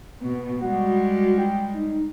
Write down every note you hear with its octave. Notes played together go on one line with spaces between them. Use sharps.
B2 B3
G3 G#3 F#4
G5
D#4